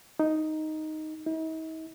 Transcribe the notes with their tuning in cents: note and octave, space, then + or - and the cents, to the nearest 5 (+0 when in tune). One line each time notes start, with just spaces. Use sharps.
D#4 +0
D#4 +45